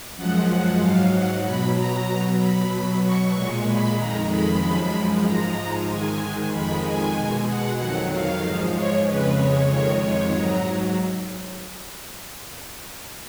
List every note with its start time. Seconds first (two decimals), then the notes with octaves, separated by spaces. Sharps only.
0.16 F#2 F3 G#3 F#5
0.48 F#5
0.80 G#2 F#3 F5
1.12 F#5
1.43 B2 F#3 B5
1.75 A#5
2.06 B2 F#3
2.39 B5
2.70 B2 F#3
3.02 C#6
3.34 A#2 G#3
3.65 B5
3.97 F2 D#3 G#3 A#5
4.29 B5
4.61 F#2 F3 G#3
5.24 G#2 F3 G#3 A#5
5.87 G#2 D#3 G#3 G#5
6.51 F2 D#3 G#3 B5
6.83 G#5
7.15 B2 G#3
7.46 F#5
7.78 F2 D#3 F#3 F#5
8.10 F5
8.41 G#2 F3 G#3
8.73 C#5
9.05 F2 C#3 G#3 B4
9.36 C#5
9.69 F2 D#3 G#3 C#5
10.00 C#5
10.32 G#2 F#3 A#5